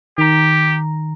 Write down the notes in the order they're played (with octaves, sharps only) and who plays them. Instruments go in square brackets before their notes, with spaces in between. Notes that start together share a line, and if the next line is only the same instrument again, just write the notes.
[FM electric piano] D#3 A#5 [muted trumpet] G4